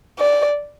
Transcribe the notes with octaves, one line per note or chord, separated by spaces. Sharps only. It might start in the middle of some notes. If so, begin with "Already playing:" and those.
D5